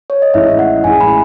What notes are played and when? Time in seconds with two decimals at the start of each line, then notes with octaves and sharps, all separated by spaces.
0.10 C#5
0.22 D#5
0.34 A1 A2 G#3 E5
0.59 F#5
0.84 A1 A2 G#3 G#5
1.01 B5